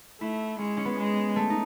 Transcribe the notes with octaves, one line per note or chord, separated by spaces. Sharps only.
A3 E4
G#3 C#4
C#4
B3
G#3
A3
D#4